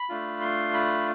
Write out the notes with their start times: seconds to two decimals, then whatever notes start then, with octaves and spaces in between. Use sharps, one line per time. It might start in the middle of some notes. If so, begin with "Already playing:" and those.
Already playing: B5
0.09 A3 D4 F4
0.41 C6
0.74 B5